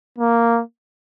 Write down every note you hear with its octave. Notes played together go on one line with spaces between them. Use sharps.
A#3